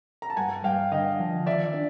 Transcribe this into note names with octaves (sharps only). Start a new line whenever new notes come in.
A#5
A5
G2 F#5 G#5
G2 F5 G5
D3 D#5 F5
F3
D#3 D5 E5
D4